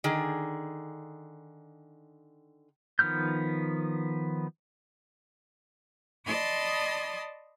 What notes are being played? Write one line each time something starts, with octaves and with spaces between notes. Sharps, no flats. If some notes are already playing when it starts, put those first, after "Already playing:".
D3 D#3 G#4
D#3 F3 B3 F6 G6
D5 D#5 A5 B5 C6 D#6